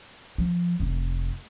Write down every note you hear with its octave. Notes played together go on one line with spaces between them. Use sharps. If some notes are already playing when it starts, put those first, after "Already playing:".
F3
F1